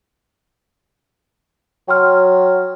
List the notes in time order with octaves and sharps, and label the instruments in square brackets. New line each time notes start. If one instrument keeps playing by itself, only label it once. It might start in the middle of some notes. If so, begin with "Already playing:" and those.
[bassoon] F#3 [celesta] G5 C6 F6